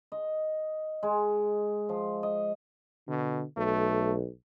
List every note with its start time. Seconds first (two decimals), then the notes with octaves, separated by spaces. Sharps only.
0.12 D#5
1.03 G#3
1.89 F3
2.23 D#5
3.08 B2 D3
3.57 B1 A3